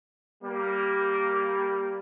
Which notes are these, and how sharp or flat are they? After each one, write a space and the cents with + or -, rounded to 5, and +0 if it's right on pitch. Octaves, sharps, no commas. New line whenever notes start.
G3 +0 A#3 +0